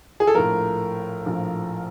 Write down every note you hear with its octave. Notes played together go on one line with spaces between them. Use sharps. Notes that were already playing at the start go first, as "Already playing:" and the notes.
G#4
A4
A#1 A2 F3 A#4
A#1 A2 F3